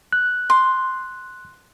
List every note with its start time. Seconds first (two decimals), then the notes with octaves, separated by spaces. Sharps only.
0.13 F#6
0.50 C6